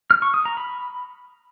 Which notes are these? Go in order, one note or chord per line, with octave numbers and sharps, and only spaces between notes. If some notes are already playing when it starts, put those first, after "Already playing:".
F6
C#6
D#6
A#5
B5